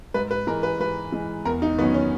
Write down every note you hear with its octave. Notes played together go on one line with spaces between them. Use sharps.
G#2 B4
B4
E3 G#3 A#4
B4
G#2 B4
E3 G#3
E2 A#4
D#4
D#3 F#3 B3 C#4
C#4